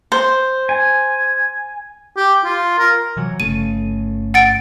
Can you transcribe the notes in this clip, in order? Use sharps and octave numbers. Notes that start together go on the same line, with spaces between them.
C5
G#5
G4
F4
A#4
C3 E3 F#3
G1 C#3 A3 D#7
F#5 A6 D7